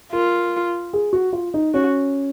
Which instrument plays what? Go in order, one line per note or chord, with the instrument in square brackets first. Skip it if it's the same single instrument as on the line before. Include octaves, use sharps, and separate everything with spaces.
[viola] F4 [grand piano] A#4
[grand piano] G#4
F#4
F4
D#4
[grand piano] C#4 [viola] F#4